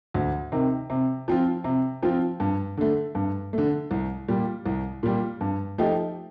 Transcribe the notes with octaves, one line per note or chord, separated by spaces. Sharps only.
D2
C3 D#3
C3
F3 C4 F4
C3
F3 C4 F4
G2
D3 A3
G2
D3 A3
C2
A#2 G3
C2
A#2 G3
G2
F3 A3 D#4 G4